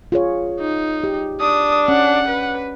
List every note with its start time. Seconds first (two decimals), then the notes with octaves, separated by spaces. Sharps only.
0.12 F4 G#4 C#5
0.60 D#4
1.04 G4
1.41 D4 D#6
1.88 C#4 F#5
2.29 B4